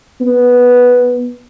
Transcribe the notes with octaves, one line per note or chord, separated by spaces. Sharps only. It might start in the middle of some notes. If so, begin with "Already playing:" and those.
B3